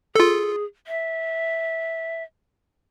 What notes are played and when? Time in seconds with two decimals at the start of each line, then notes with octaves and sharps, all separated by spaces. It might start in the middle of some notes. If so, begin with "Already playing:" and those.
0.15 F4 G#4 A4
0.87 E5